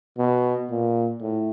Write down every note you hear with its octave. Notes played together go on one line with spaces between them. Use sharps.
B2
A#2
A2